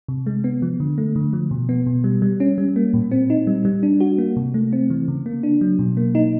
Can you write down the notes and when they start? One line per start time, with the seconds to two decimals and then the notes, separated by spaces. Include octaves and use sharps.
0.08 C3
0.26 G#3
0.44 B3
0.62 F3
0.80 D3
0.98 A3
1.16 D3
1.33 F3
1.51 B2
1.69 B3
1.87 B2
2.04 G3
2.22 G3
2.40 C#4
2.58 G3
2.76 A#3
2.94 A#2
3.11 C4
3.30 D#4
3.47 G3
3.65 G3
3.83 D4
4.00 F#4
4.18 A#3
4.37 C3
4.54 A3
4.73 C4
4.90 E3
5.08 C#3
5.26 A#3
5.43 D4
5.61 F#3
5.79 B2
5.97 A#3
6.15 D#4